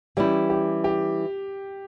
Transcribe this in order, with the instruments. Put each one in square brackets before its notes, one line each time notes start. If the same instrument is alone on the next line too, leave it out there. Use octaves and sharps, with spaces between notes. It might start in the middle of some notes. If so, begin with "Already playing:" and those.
[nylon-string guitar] E3 G3 C#4 E4 [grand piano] G4
[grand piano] G4
G4